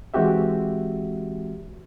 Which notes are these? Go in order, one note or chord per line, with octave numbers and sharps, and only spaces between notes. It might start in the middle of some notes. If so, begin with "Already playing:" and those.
E3 G#3 C4 F#4 G4 E5